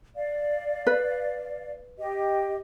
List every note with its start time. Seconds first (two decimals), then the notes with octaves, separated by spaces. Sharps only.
0.16 D5 F5
0.87 B4
1.98 G4 D#5